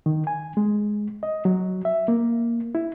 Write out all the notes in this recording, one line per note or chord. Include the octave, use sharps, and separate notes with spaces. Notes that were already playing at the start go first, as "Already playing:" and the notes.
D#3
G#5
G#3
D#5
F#3
E5
A#3
E4